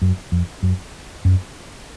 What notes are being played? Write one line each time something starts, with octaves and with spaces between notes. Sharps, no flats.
F#2
F2
F#2
F#2